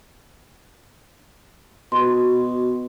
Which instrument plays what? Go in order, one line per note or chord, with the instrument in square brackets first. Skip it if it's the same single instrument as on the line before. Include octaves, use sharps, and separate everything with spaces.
[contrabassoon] B2 [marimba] F#4 C6